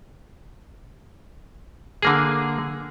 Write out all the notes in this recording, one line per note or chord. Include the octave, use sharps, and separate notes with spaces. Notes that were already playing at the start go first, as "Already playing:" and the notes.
D3 A#3 G#4